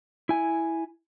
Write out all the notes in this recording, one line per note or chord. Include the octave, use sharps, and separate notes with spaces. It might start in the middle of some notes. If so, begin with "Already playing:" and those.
E4 G#5